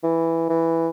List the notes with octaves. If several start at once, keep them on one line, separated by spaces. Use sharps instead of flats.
E3
E3